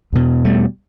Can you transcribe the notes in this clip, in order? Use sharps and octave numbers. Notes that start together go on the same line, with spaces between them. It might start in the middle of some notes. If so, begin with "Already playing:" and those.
E2 B2
G3 A3